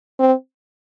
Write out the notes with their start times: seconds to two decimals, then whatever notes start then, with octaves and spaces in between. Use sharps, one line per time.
0.20 C4